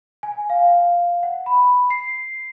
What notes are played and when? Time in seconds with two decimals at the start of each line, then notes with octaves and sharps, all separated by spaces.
0.23 G#5
0.50 F5
1.23 F#5
1.46 B5
1.90 C7